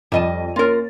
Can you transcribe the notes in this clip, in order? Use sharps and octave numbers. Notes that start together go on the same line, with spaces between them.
F2 G3 D#5 A5 D#7
A#3 C#4 F4 A#4 A6